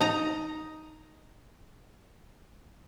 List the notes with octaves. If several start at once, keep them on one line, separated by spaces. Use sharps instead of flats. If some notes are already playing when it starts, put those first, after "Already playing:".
D#4 A#5